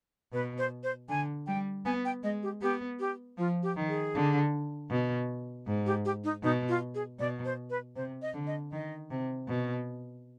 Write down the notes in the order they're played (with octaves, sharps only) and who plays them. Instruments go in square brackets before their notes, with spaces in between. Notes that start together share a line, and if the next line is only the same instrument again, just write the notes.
[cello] B2 [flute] B4
[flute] C5
C5
[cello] D3 [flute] G#5
[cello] G3 [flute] G5
[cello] B3 [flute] G#5
[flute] G5
[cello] G#3 [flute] D#5
[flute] G4
[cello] B3 [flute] G4
[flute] G4
[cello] F3 [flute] F4
[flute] G4
[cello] D#3
[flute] G#4
[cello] D3
B2
G#2
[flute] G4
G4
D#4
[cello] B2 [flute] D#4
[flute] F4
G#4
[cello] B2 [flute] D5
[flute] C5
B4
[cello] C3 [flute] C5
[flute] D#5
[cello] D3
[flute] D#5
[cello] D#3 [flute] D#5
[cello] C3
B2